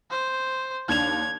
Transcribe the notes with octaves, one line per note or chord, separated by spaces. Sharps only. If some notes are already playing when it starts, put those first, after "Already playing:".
C5
D#2 D4 G#6 F7